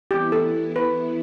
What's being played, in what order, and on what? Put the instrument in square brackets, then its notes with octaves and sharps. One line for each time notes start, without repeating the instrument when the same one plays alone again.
[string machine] E3 B3 E4 [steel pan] G4
[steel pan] A4
B4